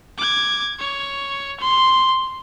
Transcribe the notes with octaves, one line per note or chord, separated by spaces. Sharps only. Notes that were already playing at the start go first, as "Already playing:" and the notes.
D6 G#6
C#5
C6